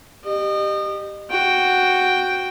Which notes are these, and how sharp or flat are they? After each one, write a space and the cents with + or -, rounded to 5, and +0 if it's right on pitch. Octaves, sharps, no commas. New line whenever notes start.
G4 +0 D#5 -30
F#4 +0 G5 +0